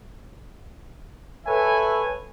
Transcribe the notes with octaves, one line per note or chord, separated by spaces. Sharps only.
A4 B4 C#5 E5 G#5